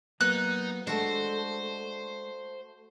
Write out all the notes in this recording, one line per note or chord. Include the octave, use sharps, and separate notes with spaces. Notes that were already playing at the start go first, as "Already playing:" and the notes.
F#3 A#3 B3 D#4 F#6
G#3 A3 D4 F#4 C5